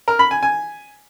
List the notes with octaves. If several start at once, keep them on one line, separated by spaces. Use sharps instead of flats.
A#4
B5
G#5
G#5